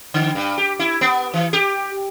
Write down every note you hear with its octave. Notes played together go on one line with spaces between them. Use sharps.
D3
G2
G4
E4
B3
E3
G4